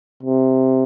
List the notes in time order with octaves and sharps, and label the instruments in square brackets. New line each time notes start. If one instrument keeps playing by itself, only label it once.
[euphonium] C3